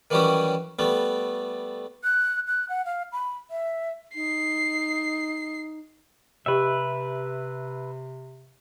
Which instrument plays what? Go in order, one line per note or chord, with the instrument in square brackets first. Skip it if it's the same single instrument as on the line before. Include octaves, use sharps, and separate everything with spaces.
[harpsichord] D#3 E3 F#3 G3 C#4 G4
G3 A3 B3
[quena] F#6
F#6
F#5
F5
B5
E5
[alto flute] D#4 [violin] C7
[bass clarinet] C3 [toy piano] G4 D#5 G5 [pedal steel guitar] B4 E5